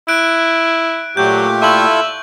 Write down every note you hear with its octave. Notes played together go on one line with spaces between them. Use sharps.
E4 F#6 D7
A#2 F#3 A3 G4 G6
E4 F4 A4 E5 C#6 F#7